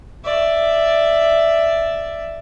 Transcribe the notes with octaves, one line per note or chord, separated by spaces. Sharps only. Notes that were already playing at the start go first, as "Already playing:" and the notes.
D5 E5